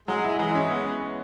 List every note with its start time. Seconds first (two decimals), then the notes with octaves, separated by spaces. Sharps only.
0.08 F#3 G#3
0.24 E4
0.39 E3 G#3
0.55 C#4
0.71 B3